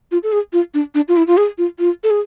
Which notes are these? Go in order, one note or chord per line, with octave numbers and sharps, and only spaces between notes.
F4
A4
G#4
F4
D4
D4
F4
E4
F4
G#4
F4
F4
A4
G#4